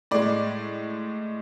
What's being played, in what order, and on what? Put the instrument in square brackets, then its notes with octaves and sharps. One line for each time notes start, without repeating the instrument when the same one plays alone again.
[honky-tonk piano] A2 G#3 D5